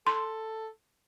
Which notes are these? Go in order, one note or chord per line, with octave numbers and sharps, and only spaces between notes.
A4 C6